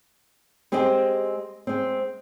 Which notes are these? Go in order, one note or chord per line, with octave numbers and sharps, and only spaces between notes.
G#3 C4 G4 G#4 C5 D#5
G#3 C4